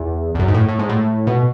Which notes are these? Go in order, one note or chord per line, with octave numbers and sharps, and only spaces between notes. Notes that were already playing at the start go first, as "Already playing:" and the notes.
Already playing: E2
E2
F#2
G#2
A2
A2
G#2
A2
B2